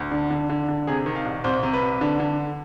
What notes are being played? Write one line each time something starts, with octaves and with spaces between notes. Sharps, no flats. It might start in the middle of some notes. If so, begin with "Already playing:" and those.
Already playing: D2
D3
D3
D3
D3
C3 G#4
D#3
F5
C2
C2 C5
C3
B4
C2
D3
D3